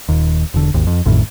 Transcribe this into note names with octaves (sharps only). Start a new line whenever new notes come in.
D#1 D#2
E1 D3
G#1 D#2
F2
A1 F2 A2 D#3